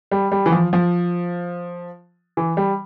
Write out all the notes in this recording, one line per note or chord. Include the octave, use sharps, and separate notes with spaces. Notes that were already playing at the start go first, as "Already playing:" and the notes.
G3
G3
E3
F3
F3
E3
G3